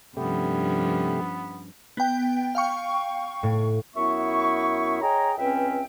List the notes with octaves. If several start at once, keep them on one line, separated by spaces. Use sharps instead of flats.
G2 C3 F3 A3 B3 C#4 G4
B3 G5
F5 G5 C#6
A2
F#2 B3 E4 E5 C#6
G#4 C#5 D#5 G5 A#5
C#2 C4 C#4 B4 E5 G5